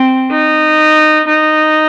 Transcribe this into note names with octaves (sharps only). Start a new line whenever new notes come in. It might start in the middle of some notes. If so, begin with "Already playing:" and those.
Already playing: C4
D#4
D#4